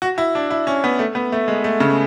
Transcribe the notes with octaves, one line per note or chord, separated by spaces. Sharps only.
F#4
E4
D4
E4
C#4
B3
A3
B3
A3
G#3
A3
C#3